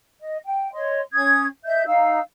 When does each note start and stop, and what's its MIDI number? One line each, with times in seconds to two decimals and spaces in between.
0.21 0.38 75
0.45 0.72 79
0.73 1.00 73
0.73 1.00 75
0.73 1.00 84
1.13 1.46 61
1.13 1.46 87
1.13 1.46 92
1.65 1.83 75
1.65 1.83 76
1.65 1.83 91
1.86 2.20 63
1.86 2.20 77
1.86 2.20 88